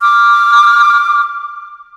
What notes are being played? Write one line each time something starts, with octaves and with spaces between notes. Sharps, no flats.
D6 F6